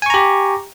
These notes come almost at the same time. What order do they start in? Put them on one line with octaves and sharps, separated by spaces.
G#5 C#6 A#5 G4